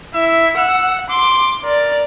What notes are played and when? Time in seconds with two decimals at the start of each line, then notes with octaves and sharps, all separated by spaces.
0.14 E4 E5
0.57 F#5 E6
1.10 C6 D6
1.65 A#4 D5